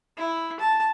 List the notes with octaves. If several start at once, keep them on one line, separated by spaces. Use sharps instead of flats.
E4
A5